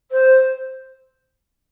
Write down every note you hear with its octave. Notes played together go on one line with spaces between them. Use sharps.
C5